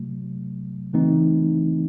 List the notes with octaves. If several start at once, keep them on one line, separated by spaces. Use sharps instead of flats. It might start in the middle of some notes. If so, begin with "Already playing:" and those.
Already playing: C3 F#3 A3
C#3 E3 A3 C4 D#4